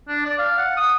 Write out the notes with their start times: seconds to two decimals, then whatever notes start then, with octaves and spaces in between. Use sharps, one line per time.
0.09 D4
0.26 D5
0.39 F5
0.58 F#5
0.77 D#6